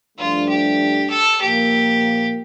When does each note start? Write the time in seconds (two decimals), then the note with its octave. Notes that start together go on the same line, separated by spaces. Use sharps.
0.18 G2 F3 A3 D4 F4
0.49 G4
1.10 A4
1.41 A#2 F3 A#3 G4